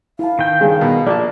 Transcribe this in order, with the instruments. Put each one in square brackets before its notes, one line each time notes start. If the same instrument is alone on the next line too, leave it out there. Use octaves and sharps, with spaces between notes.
[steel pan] E4 A5 [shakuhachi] F5
[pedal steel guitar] D#3 G5
[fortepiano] G2 C#3 [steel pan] G#4
[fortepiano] B2 A#4
[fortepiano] A#1 A5 [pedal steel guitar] A#3 [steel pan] D5